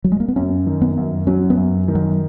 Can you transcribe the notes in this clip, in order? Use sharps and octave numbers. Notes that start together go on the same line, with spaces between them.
F#3
G#3
A#3
B3
F#2 C#4
D#3
B3
F#2
F#3 C#4
B3
F#2
D#3
F#3